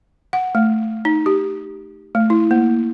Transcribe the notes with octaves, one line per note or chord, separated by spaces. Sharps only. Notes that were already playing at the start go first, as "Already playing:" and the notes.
F#5
A3
D#4
G4
A3
E4
A#3